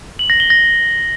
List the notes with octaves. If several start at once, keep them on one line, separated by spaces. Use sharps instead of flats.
F#7
A#6
G7
A#6